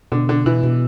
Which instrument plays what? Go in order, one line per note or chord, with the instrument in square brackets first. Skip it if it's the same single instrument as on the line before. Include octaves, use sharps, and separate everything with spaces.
[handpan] B2 [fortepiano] D3
[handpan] B2 [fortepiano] D3
[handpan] B2 [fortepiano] E3
[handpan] B2